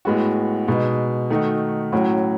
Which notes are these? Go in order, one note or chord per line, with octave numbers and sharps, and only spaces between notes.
A2 G#3 B3 F#4
B2 G#3 D#4
D#3 A3 D#4 F#4
A2 F#3 C#4 F#4